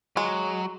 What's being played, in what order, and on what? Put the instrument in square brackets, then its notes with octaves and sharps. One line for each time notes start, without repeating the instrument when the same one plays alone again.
[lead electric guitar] F#3 [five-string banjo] G#3